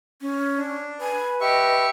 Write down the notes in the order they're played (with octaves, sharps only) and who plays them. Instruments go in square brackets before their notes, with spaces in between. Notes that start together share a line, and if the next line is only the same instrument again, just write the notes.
[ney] C#4
[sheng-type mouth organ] D4
[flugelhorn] B4 [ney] G#5
[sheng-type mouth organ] G4 E5 C#6 [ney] D#5